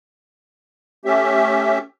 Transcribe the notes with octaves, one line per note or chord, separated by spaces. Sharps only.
A3 C#4 G4 E5